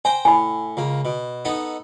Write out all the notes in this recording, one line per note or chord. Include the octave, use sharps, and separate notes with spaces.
C5 G5 G#5 A#5
A2 G#5 B5
C#2 A#3
B2
B3 D#4 A4